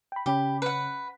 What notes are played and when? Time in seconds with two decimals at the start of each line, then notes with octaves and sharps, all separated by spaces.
0.12 G5 B5
0.26 C#3 C#4 G4 B5
0.62 B4 F#5